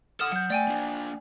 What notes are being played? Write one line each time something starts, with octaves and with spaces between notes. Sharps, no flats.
A4 F#5 D#6 F6 E7
F#3 F#5 G6
A3 D5 G5 G#5
A#3 D4